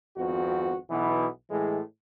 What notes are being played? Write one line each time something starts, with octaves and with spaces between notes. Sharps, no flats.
G#1 F2 B3 F#4
B1 B2 E3 B3
A2 E3 G#3